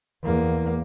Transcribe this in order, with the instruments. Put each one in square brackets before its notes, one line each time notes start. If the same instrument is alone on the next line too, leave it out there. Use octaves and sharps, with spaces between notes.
[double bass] E2 A#3